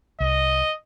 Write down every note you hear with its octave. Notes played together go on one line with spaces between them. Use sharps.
C2 D#5